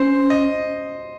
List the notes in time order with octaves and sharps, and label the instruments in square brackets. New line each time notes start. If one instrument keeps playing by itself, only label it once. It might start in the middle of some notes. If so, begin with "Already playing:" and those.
Already playing: [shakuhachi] C#4 [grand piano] C5
[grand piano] D#5